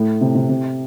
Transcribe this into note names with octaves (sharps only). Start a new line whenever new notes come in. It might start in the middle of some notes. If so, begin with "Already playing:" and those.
Already playing: A2
C3
C3
C3